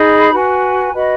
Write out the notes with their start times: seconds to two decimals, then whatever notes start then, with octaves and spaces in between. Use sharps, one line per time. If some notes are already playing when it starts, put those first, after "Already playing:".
Already playing: D#4 G#4 D#5 B5
0.33 F#4 B4 G#5
0.93 F#4 B4 D#5 B5